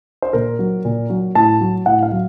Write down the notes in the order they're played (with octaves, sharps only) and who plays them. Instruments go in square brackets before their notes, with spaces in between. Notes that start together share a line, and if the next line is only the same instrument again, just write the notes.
[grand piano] C5
A#2 A#4
F#3
A#2
F#3
A2 A5
F#3
A2 F#5
F5
F#3